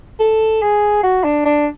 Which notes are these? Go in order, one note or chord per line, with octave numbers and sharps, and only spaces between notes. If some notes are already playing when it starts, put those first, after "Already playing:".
A4
G#4
F#4
D4
D4